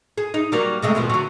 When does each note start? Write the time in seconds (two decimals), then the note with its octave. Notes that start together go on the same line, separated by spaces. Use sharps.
0.18 G#4
0.34 D#4
0.52 F#3 G3 A#3
0.82 C3 G#3 A3
0.95 D#2 B2 F3
1.09 D3 F#3